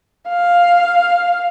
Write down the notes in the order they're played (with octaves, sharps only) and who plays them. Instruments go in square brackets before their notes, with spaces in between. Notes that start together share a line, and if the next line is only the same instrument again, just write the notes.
[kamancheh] F5